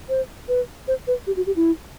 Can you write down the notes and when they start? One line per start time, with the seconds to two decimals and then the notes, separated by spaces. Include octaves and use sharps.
0.09 C5
0.48 B4
0.88 C5
1.07 B4
1.27 G4
1.37 F#4
1.47 G4
1.56 E4